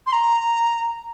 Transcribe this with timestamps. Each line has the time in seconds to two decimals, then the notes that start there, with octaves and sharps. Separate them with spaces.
0.06 C6
0.13 A#5